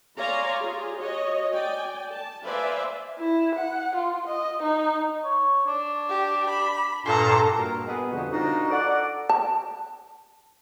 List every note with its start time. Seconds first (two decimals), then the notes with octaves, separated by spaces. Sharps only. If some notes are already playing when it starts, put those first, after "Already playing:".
0.18 C#5 D5 F5 G#5 A#5 C6
0.61 F4 G4 G#4
0.99 F#4 C#5 D#5
1.53 D5 G5 G#5
2.14 A5
2.44 B4 C5 D5 E5 F5 G#5
3.18 E4
3.55 F#5
3.95 F4
4.27 D#5
4.62 D#4
5.25 C#5
5.67 D4
6.09 G4
6.50 B5
7.06 G2 A#2 A4 A#5 C6
7.57 G2 A#2 F#4 A#4
7.87 B3 G#4 D#5
8.11 F2 B2 D3 G3 F#4
8.31 D4 D#4 F4 F#4 A#4 C5
8.71 A4 D5 F#5
9.29 A5